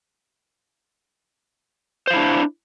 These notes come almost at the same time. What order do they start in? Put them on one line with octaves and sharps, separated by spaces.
C5 F5 E4 D4